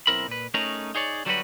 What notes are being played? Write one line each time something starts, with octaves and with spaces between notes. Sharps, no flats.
B1 C#3 C4 E4 A#4 B5
A#2 B4
A3 C#4 D#4 G#4 A#4 A#5
D#4 G#4 C#5 D5
D3 F#3 G3 F4 F#4 B4